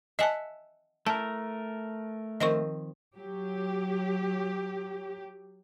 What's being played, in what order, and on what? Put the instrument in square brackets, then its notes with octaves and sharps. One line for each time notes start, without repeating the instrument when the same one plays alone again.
[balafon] D#5 G#5 A5 [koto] E5 F#5
[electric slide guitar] A3 A#4 [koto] E4 [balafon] A5
[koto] D#3 F3 C4 [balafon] D#5 C#6
[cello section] F#3 G4